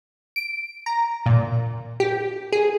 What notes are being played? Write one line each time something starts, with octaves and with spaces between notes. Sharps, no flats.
D7
A#5
A#2
G4
G#4